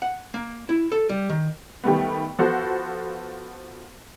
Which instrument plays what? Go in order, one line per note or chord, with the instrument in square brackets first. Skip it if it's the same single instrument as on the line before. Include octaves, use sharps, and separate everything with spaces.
[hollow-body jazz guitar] F#5
A#3
E4
A4
G3
D#3
[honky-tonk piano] D#3 G3 A3 B3
F3 B3 F#4 A4 C5